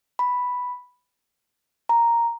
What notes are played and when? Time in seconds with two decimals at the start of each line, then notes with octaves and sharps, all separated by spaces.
0.19 B5
1.89 A#5